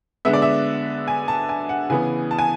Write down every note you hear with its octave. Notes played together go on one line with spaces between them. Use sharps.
D3 G#3 B3 E5
D5
E5
G#5
A5
G#5
F#5
C#3 E3 B3 G#5
A5
G#5